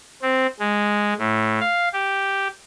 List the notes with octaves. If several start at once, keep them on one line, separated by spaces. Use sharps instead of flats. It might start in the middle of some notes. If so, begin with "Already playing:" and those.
C4
G#3
A2
F5
G4